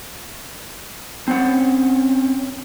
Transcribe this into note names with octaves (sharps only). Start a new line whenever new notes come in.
C4 C#4 F#5